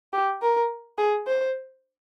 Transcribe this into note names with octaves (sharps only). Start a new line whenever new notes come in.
G4
A#4
G#4
C5